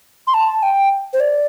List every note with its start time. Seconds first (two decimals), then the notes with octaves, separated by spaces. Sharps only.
0.27 C6
0.34 A5
0.63 G5
1.13 C5
1.20 D5